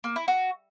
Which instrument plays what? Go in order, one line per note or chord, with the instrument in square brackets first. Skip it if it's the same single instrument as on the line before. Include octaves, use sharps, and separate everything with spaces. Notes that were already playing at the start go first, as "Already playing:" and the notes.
[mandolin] A#3
E4
F#4